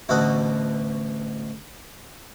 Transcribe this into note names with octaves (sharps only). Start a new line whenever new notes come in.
A1 D2 B2 A4 F#5 D#6